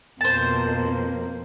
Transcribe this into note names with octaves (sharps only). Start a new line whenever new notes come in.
F2 B2 A#3 C5 A5